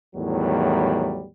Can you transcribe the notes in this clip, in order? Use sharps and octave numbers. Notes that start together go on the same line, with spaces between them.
E2 A2 D#3 F#3 G3